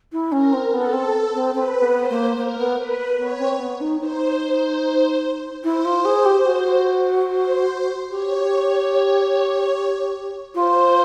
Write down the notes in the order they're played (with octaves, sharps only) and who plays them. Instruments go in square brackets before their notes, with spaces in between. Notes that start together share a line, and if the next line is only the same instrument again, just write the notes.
[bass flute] E4
[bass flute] C#4 [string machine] A#4
[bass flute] C4
[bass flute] B3 [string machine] A4
[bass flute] C4
C4
[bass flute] C4 [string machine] B4
[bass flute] B3
[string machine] C5
[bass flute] A#3
[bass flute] A#3 [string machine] A#4
[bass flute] B3
[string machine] B4
[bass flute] B3 [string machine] C#5
[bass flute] C4
B3
D#4
[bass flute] D#4 [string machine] C5
[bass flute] E4 [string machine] C5
[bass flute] F4
G#4
G4
F#4
[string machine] C5
[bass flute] G4 [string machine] C#5
[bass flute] F4 [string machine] C5